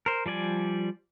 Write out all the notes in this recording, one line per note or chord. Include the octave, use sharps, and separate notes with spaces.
A#4 C5
F3 G3 D5 G#5